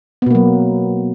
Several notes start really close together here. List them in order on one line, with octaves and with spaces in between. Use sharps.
B3 B2 A#3 F#3